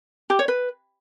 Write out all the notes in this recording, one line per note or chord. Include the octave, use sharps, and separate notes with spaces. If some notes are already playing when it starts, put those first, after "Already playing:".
G4
C#5
B4